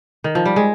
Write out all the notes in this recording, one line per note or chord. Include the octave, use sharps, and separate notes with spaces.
D#3
F3
G3
G#3